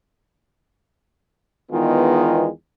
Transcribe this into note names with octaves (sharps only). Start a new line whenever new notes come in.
E2 D#3 G#3 B3 F4